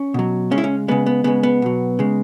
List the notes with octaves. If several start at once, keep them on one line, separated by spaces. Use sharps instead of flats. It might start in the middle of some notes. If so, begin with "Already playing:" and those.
Already playing: C#4
B2 F#3
C#3 G#3 C#4
E4
C#4
C#3 G#3 B3
B3
C#3 G#3 B3
B3
B2 F#3
C#3 G#3